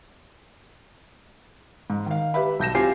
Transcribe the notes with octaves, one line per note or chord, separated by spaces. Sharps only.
G#2
D#3 F5
G4 B4 E5 B5
B1 G6 A#6 E7
C4 F4 G4 G#5 C7